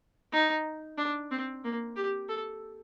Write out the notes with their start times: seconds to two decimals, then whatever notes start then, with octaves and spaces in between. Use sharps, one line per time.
0.32 D#4
0.98 D4
1.31 C4
1.64 A#3
1.96 G4
2.29 A4